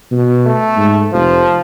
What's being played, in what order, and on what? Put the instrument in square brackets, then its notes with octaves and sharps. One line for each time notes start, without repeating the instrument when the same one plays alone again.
[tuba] B2
[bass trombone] A3
[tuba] G#2
[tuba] F1 [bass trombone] F3